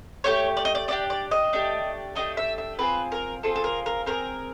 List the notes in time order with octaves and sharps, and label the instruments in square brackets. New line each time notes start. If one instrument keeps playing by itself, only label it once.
[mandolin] A3 D4 G4 C#5
D5
D#5
D5
A3 D4 G4 D5
D5
D#5
A3 D4 G4
A3 D4 G4 D#5
E5
E5
C4 F4 G#4 B4
A#4
C4 F4 G#4 A4
A4
A#4
A#4
C4 F4 G#4 A#4